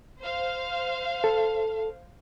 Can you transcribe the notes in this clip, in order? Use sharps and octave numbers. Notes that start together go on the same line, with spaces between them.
C5 F5
A4